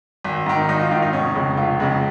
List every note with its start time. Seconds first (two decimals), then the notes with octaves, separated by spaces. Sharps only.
0.24 G#1
0.46 G#2 D#3
0.69 G#1 D#4
0.79 F4
0.91 G#2 D#3 F4
1.02 D#4
1.13 F1 C#4
1.35 F2 C#3 G#3
1.57 F1 F4
1.80 F2 C#3 G#3